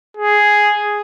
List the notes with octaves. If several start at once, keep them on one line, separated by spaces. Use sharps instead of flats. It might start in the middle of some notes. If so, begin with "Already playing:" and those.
G#4